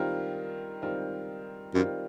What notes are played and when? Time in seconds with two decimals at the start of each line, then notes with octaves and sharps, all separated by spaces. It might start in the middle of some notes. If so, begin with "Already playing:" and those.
Already playing: D#3 G3 C4 F4 A#4
0.82 D#3 G3 C4 F4 A#4
1.74 F#2 D#3 G3 C4 F4 A#4